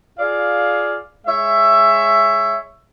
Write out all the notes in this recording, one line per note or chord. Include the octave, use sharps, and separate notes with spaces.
F4 G#4 D5 F5
G#3 C#5 E5